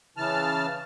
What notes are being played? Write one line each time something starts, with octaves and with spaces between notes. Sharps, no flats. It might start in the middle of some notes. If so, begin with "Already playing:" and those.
C#3 E3 A5 F6